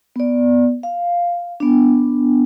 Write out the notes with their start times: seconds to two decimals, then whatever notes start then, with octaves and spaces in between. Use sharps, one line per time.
0.16 B3 D5
0.83 F5
1.60 B3 D4